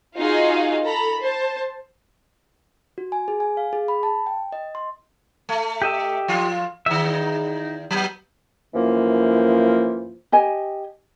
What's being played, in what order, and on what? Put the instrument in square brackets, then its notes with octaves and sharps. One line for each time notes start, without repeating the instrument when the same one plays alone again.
[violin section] D#4 F4 F#4 G#4 D#5 F5
A4 A#5 B5
C5 A5
[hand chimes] F#4
G#5
G#4
G#5
F5
G#4
B5
A5
G5
D#5
C6
[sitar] A3
[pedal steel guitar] G4 D#5 E5
[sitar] F3 F4
[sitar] E2 D#3 [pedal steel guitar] E5
[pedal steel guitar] D#4
[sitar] F#3 B3
[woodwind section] F#2 E3 F3 A#3
[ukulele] G4 D#5 G#5